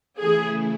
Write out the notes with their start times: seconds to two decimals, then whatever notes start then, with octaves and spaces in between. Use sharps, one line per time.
0.20 C#3 E3 A3 E4 G#4